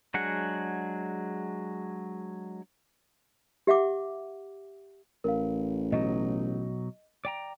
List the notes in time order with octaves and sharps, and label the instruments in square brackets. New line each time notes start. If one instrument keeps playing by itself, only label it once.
[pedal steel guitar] F#3 G#3 D4 G#4 F#5
[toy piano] G4 E5 F#5 D6
[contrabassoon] A1 [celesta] A#4 F5
[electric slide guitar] B2 F#3 D#4 [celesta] D#5
[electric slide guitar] D5 G5 A#5